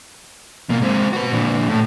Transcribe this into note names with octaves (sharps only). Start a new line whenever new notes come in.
B2 A#3
G#3 C4
F#4 B4
A#2 D3
A2